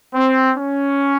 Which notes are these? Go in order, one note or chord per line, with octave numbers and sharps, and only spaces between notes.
C4
C#4